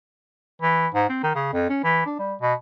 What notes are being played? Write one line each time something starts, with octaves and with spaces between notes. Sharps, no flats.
E3
G#2
C4
D#3
C#3
F2
C#4
E3
D4
G3
B2